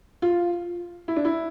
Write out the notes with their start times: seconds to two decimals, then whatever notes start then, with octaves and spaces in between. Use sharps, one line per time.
0.22 F4
1.08 E4
1.16 D4
1.25 E4